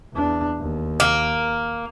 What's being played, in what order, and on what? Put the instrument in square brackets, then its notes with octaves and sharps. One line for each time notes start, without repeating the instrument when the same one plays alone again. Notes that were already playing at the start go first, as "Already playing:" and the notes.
[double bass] E2 D4
D#2
[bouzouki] A#3